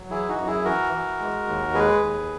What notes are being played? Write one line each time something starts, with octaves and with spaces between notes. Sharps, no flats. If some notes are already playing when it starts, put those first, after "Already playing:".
Already playing: F#3
E3 E4 G#4
D#4 F#4
F#2
E4 G#4
E3 F#4 A#4
E3
G#3
D#2
G#3 G#4 B4
D#2